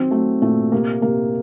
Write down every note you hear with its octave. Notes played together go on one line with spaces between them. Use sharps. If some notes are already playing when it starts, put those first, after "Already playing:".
Already playing: D#3 F#3 C4
F#3 A3
A#2 A3
C3 A#3
C3 A#3